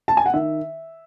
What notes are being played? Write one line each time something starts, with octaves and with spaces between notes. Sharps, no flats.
A5
G#5
F#5
D#3 E5